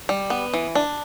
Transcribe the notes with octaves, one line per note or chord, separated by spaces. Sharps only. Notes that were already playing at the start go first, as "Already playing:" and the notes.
G3
B3
E3
D4